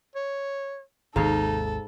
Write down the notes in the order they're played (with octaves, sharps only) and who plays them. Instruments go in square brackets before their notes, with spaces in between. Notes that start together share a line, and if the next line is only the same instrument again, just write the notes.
[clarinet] C#5
[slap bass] G#1 D#2 C3 [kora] G#2 F5 [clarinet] D#4 [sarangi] A4